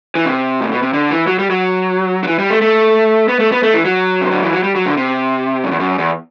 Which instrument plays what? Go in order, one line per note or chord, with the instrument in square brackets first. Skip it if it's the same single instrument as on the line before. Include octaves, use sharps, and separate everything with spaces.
[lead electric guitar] E3
C3
A2
B2
C3
D3
E3
F#3
G3
F#3
F#3
E3
G3
A3
A3
B3
A3
B3
A3
E3
F#3
C3
D3
E3
F#3
G3
F#3
D3
C3
F#2
E2
F#2
E2